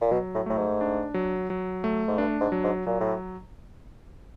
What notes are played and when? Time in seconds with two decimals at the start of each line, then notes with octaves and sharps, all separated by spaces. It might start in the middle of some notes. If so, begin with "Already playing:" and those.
0.01 A#2
0.11 B2 F#3
0.34 A2
0.46 A2 A3
0.58 G#2
0.81 D4
1.14 F#3
1.50 F#3
1.84 A3
2.08 G#2
2.18 G2 D4
2.41 G#2
2.52 F#3
2.64 G#2
2.86 A#2 F#3
3.00 A2